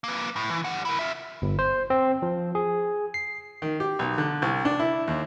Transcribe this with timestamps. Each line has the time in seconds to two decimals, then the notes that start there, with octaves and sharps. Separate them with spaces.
0.04 A#3 B4
0.36 A2
0.50 E3
0.65 G3 F#5
0.85 E4 A#4
0.99 F4 E5
1.42 G1
1.59 C5
1.90 C4
2.22 F3
2.55 G#4
3.14 C7
3.62 D#3
3.80 G4
3.99 B1
4.18 D3
4.42 C2
4.65 D4
4.79 E4
5.08 D#2